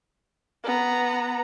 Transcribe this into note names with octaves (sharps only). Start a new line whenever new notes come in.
B3 A#5